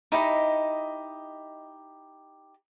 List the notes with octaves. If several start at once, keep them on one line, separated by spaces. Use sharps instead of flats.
D#4 E4 G4 D#5